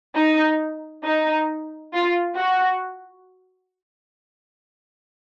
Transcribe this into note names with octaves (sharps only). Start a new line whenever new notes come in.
D#4
D#4
F4
F#4